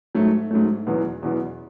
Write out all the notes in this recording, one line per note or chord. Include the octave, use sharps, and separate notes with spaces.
G#2 F#3 A3
G#2 F#3 A3
E2 B2 F#3 B3
E2 B2 F#3 B3